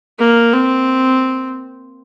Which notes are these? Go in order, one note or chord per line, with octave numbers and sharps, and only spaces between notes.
A#3
C4